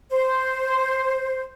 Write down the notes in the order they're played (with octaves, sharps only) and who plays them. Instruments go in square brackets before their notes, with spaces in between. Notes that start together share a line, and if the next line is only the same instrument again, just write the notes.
[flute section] C5